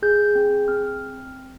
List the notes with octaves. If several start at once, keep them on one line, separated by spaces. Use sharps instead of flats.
G#4 G6
C4
C4 F6